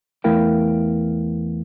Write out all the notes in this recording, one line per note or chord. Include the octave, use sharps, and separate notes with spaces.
E2 A3 E4 A#4 F5 G5